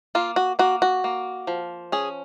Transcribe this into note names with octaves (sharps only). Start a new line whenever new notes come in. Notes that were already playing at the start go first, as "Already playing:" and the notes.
A#3 F4
F#4
A#3 F#4
F#4
A#3
F3
C#4 G#4